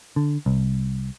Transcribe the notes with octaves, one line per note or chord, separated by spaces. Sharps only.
D3
C2